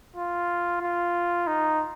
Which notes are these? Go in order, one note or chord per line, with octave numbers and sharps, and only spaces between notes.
F4
F4
D#4